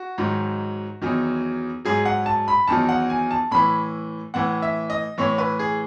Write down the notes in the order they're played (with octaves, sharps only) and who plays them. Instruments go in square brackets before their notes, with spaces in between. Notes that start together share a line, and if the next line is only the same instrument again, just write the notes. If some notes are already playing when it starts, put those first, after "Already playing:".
Already playing: [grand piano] F#4
G#2 D#3 F#3
E2 D#3 F#3
G#2 F#3 G#4
F#5
A5
B5
E2 D#3 F#3 A5
F#5
G#5
A5
A2 E3 B5
A2 E3 F#5
E5
D#5
A2 E3 C#5
B4
G#4